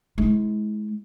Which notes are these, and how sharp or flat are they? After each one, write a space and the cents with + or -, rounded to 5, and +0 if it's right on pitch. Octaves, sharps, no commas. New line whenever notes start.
G#3 +30 E4 -25